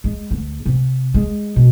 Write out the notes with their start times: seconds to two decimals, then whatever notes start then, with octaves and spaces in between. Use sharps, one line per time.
0.04 G#3
0.31 D2
0.66 C3
1.14 G#3
1.56 B2